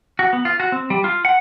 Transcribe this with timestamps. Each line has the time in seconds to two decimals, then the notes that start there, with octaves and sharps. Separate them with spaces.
0.19 F#4
0.33 B3
0.45 F4
0.60 F#4
0.72 C4
0.90 G3
1.04 F4
1.25 F#5